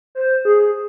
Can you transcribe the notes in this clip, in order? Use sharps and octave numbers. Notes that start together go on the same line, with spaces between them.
C5
G#4